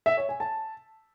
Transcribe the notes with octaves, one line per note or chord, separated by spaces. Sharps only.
E5
C#5
G#5
A5